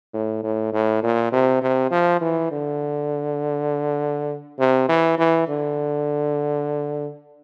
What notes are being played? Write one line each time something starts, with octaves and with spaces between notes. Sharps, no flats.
A2
A2
A2
A#2
C3
C3
F3
E3
D3
C3
E3
E3
D3